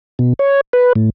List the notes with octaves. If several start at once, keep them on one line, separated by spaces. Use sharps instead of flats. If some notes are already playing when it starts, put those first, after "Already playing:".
B2
C#5
B4
A2